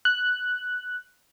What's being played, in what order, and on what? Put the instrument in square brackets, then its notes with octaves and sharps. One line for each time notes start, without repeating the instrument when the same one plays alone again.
[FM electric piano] F#6